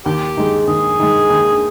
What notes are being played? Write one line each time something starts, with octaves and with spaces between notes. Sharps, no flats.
D#2 G4
D#3 G#3
D#2 G#4
D#3 G#3
D#2